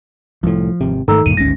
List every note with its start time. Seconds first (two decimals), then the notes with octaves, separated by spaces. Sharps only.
0.43 C2 A2 F3
0.81 G#1 C3
1.08 G#2 D#3 G#3 A3 A4 A#5 E6
1.26 D2 G2 A#2 D#7
1.37 G#1 D2 G#2 C#4 A#6